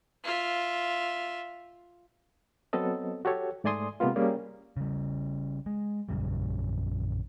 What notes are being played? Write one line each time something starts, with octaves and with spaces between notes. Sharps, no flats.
F4 E5
F#3 B3 C4 A4 D#5
F#4 G4 A4 C#5
G#2 A3 D5 G#5 C6 D#6
C3 G#3 A#3 B3 F4
G3 A#3 C#4 G#4
C#3 G3
G#3
A#1 F#2 C#3 G3